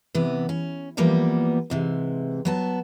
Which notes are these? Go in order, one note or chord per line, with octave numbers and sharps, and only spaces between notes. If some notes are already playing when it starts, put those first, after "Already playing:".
C3 E3 B3
C#4
E3 F3 G3 A#3 B3
G#2 C3 E3
F#3 B3 A5